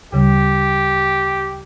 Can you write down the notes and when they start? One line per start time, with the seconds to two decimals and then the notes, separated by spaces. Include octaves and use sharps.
0.12 D2 C#3 G3 G4